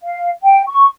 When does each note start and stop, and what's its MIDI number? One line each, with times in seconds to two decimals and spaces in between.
0.01 0.30 77
0.43 0.63 79
0.67 0.85 85